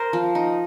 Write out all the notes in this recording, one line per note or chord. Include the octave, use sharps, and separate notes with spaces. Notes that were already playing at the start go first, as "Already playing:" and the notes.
Already playing: A#4 C5
F3
D#4